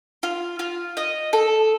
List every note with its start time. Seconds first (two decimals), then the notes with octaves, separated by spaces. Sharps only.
0.23 F4
0.59 F4
0.97 D#5
1.33 A4